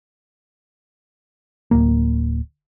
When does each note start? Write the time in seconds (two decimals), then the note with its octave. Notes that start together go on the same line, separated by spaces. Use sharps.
1.71 D1 A#3